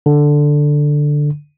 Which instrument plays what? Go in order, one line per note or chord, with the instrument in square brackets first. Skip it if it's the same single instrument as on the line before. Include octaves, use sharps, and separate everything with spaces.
[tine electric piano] D3